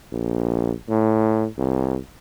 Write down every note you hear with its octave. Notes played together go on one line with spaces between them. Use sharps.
A#1
A2
C2